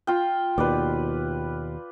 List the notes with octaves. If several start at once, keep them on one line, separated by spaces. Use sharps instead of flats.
F4 G5
D#2 B2 B4 D5